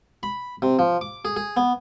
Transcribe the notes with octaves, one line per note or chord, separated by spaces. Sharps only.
B5
C3
F3
D6
G#4
G#4
B3